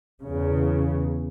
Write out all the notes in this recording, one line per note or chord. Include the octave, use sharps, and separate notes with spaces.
E2 C#3